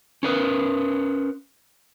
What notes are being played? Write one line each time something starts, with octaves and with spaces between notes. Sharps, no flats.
C#4 A#4 B4